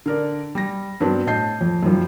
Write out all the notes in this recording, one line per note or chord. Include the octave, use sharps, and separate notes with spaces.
D3 A#4 D5
G3 A#6
G2 F#3 B3 C4 D4
A2 D#5 A5 G6 C7
F2
F#2 D#3 F3 G3